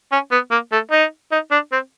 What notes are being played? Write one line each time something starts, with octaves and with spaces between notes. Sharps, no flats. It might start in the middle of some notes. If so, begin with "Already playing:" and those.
C#4
B3
A#3
A3
D#4
D#4
D4
C4